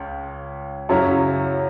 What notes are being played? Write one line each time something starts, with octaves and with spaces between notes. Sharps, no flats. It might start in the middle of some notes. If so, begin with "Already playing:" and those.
Already playing: C#2 C#3
F#2 C#3 F#3 C#4 E4